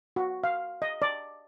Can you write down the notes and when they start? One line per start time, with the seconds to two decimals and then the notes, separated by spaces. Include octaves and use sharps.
0.16 F#4
0.44 F5
0.82 D#5
1.02 D5